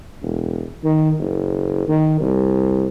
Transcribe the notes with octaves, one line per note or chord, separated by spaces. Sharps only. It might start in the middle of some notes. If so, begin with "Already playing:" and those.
E1
D#3
F#1
D#3
C2